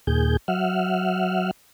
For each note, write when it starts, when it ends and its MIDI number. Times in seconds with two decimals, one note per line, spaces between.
0.07 0.37 39
0.07 0.37 46
0.07 0.37 68
0.07 0.37 91
0.48 1.51 54
0.48 1.51 76
0.48 1.51 78
0.48 1.51 89